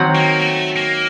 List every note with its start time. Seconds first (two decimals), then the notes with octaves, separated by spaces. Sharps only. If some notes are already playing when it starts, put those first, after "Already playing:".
Already playing: D#3 F#3 C4 F#4
0.15 A#3
0.40 A#3
0.46 A3
0.76 A#3